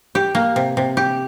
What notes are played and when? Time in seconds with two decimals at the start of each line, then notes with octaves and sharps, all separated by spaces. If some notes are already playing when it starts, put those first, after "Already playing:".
0.15 G4
0.35 A#3
0.56 C3
0.77 C3
0.97 G4